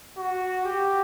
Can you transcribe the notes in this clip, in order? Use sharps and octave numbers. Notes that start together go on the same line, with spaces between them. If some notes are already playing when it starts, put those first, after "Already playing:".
F#4
G4